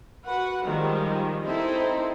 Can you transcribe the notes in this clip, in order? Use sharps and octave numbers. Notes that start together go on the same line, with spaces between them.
F#4 B4 F#5
D#3 F3 G3 G#3 D#4
C4 D#4 E4 A4 C5